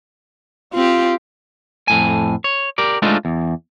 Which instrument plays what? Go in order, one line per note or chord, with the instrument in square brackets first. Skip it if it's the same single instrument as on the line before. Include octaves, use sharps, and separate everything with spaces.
[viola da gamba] C4 G4 [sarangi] F4
[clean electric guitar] F2 A2 G#5
C#5
G4 A#4 D5
G#3 A3 D4 D#4 F4 C5
E2